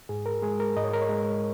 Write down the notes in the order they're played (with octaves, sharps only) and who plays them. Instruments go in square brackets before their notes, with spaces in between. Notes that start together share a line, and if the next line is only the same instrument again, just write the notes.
[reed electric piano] G#2 G#4
A#4
G#3 G#4
A#4
G#2 D#5
C#5
A#4
C#5
G#3